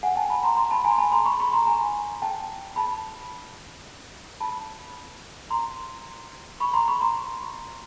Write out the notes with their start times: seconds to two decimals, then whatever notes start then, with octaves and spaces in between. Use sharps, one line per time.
0.03 F#5 G#5
0.16 G5 A5
0.30 A5 B5
0.43 A#5 C6
0.57 A#5 C6
0.71 A5 B5
0.84 G#5 A#5
0.91 C6
0.98 A5 B5
1.12 A#5 C6
1.25 B5 C#6
1.40 B5 C#6
1.53 A#5 C6
1.67 G#5 A#5
2.22 G5 A5
2.76 A5 B5
4.40 A5 B5
5.50 A#5 C6
6.60 B5 C#6
6.73 A#5 C6
6.88 B5 C#6
7.01 A#5 C6